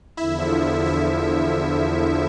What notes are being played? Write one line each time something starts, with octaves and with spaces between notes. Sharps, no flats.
E2 D3 F3 E4 E5
E4 E5